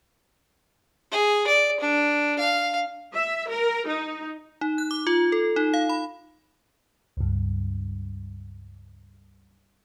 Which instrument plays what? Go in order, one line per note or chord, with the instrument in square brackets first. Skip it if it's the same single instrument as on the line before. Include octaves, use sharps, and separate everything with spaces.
[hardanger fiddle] G#4
D5
D4
F5
[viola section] E5
A#4
D#4
[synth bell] D#4
F#6
D6
F4
A4
D#4
F5
B5
[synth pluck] C#2 G2